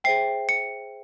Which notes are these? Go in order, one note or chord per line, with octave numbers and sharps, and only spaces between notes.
G#4 C5 E5 G5 C7
C#7